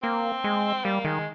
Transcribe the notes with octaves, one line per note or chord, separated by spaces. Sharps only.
A#3 C4
G#3
G3 A#3
D#3 G#3